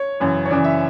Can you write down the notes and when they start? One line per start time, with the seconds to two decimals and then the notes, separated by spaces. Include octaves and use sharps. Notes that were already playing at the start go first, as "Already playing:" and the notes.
Already playing: C#5
0.20 F#2 C#3 E3
0.45 C#5
0.50 F#2 C#3 E3 D5
0.64 E5